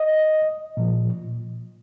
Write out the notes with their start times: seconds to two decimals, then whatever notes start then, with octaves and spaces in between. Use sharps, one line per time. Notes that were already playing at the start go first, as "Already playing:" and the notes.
Already playing: D#5
0.77 A#2 F3